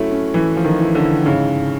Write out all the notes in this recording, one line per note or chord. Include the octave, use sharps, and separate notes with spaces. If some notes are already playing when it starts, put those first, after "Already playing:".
Already playing: F#3 A3 C#4 E4
C#4
E3 E4
F3
D#3
E4
D3
E4
G#2 C#3
G#2